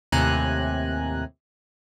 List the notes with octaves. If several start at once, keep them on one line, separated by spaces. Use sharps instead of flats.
D#2 A2 C3 G#5 A#5 F#6